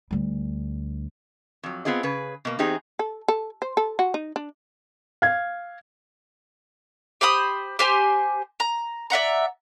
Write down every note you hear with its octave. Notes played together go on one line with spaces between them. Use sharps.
D2 G3
F2 F#3
B3 C4 F4 G#4 D#5
C#3 G#4 B4
B2 A#3
E2 C4 D#4 G4 G#4 A#5
A4
A4
C5
A4
F#4
D#4
D4
F5 G#6
G4 C5 B5 D#6
G4 C5 G#5
A#5
D5 E5 F#5 A#5